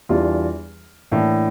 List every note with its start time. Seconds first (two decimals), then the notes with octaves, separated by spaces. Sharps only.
0.09 E2 E3 G3 D4 F4
1.11 A2 E3 A#3 D4